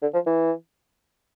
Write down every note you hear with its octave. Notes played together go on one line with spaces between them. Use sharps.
D3
F3
E3